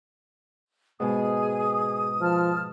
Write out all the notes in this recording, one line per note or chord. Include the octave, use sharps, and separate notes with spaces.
G#2 B2 G#4 D#6
F3 A5 F6